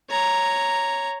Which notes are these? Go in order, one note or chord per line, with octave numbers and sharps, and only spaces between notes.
C#5 A#5